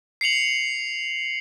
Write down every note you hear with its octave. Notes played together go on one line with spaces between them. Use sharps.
C7 C#7 F7 F#7